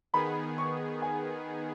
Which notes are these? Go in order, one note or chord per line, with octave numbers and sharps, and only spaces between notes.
D#3 B3 G#4 B5
C#6
G#5